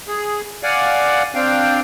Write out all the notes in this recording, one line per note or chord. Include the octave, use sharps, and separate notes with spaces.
G#4
D5 F5 F#5 G#5
C4 D4 F5 G5